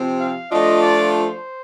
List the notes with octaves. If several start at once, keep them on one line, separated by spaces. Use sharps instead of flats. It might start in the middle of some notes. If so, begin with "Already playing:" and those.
Already playing: C3 F3 C4
F5
F3 A3 D4 F4 D#5
D5
C5